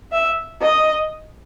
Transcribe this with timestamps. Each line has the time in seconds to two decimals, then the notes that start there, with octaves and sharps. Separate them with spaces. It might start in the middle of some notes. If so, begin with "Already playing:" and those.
0.12 E5
0.62 D#5